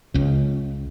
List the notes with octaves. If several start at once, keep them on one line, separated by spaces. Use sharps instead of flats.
C#2 C#3